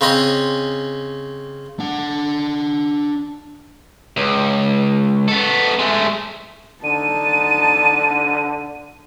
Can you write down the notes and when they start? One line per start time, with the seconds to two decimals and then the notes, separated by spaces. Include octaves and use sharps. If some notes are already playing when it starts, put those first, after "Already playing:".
0.01 C#3 C4 C#4 D#5
1.80 D4 F#5
4.17 C#2
5.28 B3 A4
5.79 G#3 A3
6.84 D3 D#4 A5 D#7